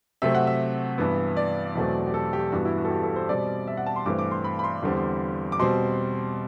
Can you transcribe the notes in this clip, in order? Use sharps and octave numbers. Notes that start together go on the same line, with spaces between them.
C3 F#3 A3 C4 E5
F#5
E5
G2 E3 B3
D5
E2 B2 F#3 A3 C4
G4
A4
G4
G2 E3 B3 F#4
E4
F#4
A4
G4
A4
C5
B2 G3 C4 D5
E5
F#5
A5
C6
G2 E3 A3 C4 D6
D6
C6
B5
B5
C6
E2 D3 G3 C4
D6
B2 G3 C4 C6